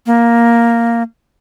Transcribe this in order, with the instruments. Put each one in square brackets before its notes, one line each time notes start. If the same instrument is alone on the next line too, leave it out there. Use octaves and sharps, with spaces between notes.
[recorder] A#3